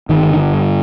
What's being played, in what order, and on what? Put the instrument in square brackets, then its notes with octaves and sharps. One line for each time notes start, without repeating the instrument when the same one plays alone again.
[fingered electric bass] G1 D#3
D3
G2